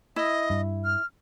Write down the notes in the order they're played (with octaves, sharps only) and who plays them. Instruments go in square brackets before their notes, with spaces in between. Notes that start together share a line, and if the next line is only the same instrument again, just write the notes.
[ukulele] E4 [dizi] D#5
[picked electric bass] G2
[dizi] F6